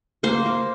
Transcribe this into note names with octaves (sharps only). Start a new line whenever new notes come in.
A#3 C5
A#3